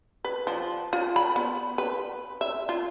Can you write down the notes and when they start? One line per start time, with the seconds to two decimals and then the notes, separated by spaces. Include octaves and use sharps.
0.25 B4
0.47 F3
0.93 F4
1.16 B5
1.36 B3
1.78 B4
2.41 E5
2.69 F4